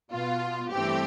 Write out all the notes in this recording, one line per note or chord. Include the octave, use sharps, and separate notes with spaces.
B2 B3 F4
G2 E3 A3 C4 G4